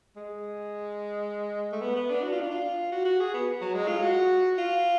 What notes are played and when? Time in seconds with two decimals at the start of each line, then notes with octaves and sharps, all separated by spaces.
0.16 G#3
1.72 A3
1.82 B3
1.96 B3
2.10 D4
2.23 F#4
2.32 F4
2.41 D4
2.50 F4
2.92 F#4
3.05 F#4
3.20 G#4
3.34 B3
3.61 F#3
3.74 G#3
3.88 F4
4.03 F#4
4.58 F4